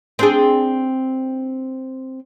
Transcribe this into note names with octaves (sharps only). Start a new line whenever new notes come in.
C4 D4 G#4